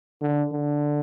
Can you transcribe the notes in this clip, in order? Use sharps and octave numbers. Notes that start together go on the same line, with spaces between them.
D3
D3